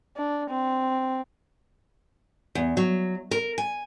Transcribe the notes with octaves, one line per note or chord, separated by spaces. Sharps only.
D4
C4
E2
F#3
A#4
G#5